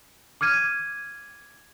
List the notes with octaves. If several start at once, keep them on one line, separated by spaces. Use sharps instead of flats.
D6 F6 G#6 D#7